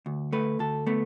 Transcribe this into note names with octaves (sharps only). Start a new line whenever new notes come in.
D2
A3 B4
D2 A4
A3 B3